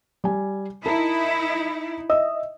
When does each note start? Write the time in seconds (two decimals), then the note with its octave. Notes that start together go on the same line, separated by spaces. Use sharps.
0.24 G3 G#5
0.86 D#4 E4 A#4 A5 A#5
2.10 D#5 E5 E6